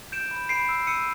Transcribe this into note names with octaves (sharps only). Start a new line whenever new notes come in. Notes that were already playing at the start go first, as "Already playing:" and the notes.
G6 D7 E7
B5
B5 C7 D7
E6
E6 C#7 D#7